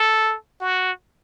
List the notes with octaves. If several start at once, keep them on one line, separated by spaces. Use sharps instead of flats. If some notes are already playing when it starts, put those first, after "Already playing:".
Already playing: A4
F#4